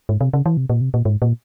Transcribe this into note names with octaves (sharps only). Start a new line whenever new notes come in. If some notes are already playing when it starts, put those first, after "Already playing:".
G#2
C3
C#3
E3
C3
A#2
C3
A#2
G#2
A#2